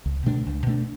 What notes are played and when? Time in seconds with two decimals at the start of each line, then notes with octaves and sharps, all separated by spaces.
0.06 C#2
0.26 B2 A3 D4
0.46 C#2
0.66 B2 A3 D4